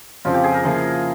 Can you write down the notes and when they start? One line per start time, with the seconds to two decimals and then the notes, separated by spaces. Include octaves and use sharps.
0.25 F2 C#3 F3 C4 F4
0.34 G4
0.44 G#4
0.54 A#4
0.63 C#3 F3 A#3 E4